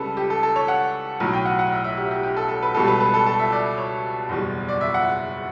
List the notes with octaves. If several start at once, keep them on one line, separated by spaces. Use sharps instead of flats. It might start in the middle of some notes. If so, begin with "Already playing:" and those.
Already playing: C#2 C#3 G3 A4 B4
G4
A4
A4
C#5
F#5
B1 A2 F#3
G5
F#5
F#5
E5
E5
G4
G4
G4
A4
A4
B4
C#2 B2 G3 A4
B4
B4
A4
A4
E5
D5
C#5
F#1 E2 B2 G3
D5
E5
F#5